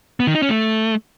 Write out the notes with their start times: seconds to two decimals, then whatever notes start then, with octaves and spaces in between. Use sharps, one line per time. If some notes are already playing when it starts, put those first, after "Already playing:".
0.20 B3
0.27 D#3
0.35 D#4
0.42 C#4
0.50 A3